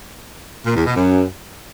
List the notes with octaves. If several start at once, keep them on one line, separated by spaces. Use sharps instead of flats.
A#2
E2
B2
F#2